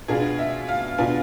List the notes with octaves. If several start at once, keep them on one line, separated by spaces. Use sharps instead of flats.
B2 B3 D4 F4 G#4
E5
F5
B2 B3 D4 F4 G#5